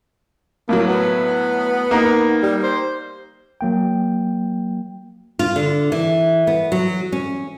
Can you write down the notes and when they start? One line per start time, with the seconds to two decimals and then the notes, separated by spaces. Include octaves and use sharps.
0.69 A2 F#3 A#3
0.87 B3
1.91 A#3 D#4 A#4
2.43 G3
2.63 C5
3.61 F#3 A#3 G5
5.39 F4
5.56 D3
5.92 E3
6.47 B3
6.72 F#3
7.12 C#4